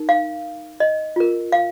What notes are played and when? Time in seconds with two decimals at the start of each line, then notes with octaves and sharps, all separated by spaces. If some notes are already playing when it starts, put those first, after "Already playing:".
Already playing: D#4 A#4
0.09 F5
0.80 D#5
1.16 F4 A#4
1.52 F5